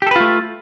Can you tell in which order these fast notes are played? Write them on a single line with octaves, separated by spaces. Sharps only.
G4 A4 B4 F4 A3